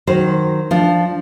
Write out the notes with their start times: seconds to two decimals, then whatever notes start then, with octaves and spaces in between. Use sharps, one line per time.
0.07 D#3 F#3 A#4 C5
0.71 F3 D4